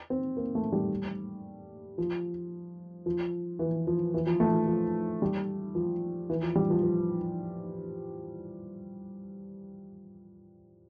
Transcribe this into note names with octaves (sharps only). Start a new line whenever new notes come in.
C4
A#3
A3
G3
F3
F3
E3
F3
E3
F3
A3
F3
F3
G3
F3
E3
F3
G3
F3
F3